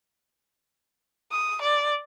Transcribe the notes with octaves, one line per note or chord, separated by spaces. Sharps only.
D#6
D5